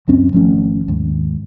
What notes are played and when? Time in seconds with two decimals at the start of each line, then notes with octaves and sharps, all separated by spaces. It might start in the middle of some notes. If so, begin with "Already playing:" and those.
0.08 C#2 F#2 C4 C#4
0.33 G#1 F3 A3 C#4
0.88 D#2 G#2